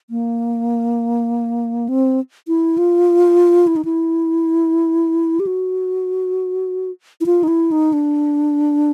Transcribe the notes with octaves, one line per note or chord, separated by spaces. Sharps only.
A#3
C4
E4
F4
E4
D#4
E4
G4
F#4
E4
F4
D#4
E4
D#4
D4